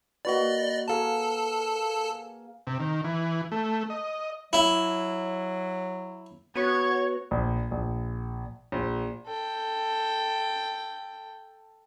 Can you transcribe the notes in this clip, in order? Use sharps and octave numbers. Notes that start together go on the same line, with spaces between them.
A#3 F#4 B4 D5 D#5
G#4 A4 F5 A5 A#5
C3
D#3
E3
A3
D#5
F#3 E4
B3 F#4 C#5 C#6 G#6
A#1
A#1
A#1
A4 G5